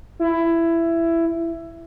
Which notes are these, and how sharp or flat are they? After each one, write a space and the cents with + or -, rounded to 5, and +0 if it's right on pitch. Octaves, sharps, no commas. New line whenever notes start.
E4 +15